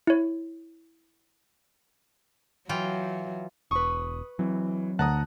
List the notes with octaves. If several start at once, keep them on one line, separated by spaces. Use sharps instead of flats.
E4 C#5
E3 F#3 F4 G5
E1 B4 C#6 D#6
E3 F#3 C4
D2 F#5 A5 A#5 D#6 F#6